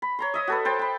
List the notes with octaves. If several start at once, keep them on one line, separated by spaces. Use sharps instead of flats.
B5
C#5 A#5 C6
D#5 E5 D#6
F#4 A4 B4
C5 G5 A5
G5 B5